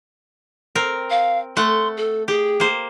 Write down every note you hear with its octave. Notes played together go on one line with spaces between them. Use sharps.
C4 A#4
F5
A3 F#5 C6
A4
G4 G#4
A#3 C5